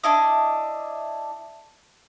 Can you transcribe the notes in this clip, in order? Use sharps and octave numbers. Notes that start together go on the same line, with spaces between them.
D4 E4 D#5